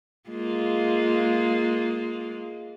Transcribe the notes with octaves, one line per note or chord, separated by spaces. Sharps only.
G#3 A#3 F4